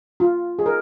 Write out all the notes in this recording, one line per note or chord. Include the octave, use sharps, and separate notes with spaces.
F4
G#4
A#4